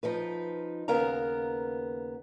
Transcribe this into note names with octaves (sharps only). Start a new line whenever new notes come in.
F3 D#4 B4
D#2 C#3 B3 A#4 F5 A#5